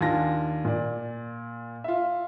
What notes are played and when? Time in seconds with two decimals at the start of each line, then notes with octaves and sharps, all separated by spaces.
0.01 D#2 D4 F4 G#5 A5 A#6
0.65 A#2 D5
1.84 F4 E5